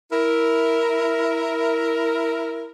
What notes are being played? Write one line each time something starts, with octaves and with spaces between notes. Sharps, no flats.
E4 A#4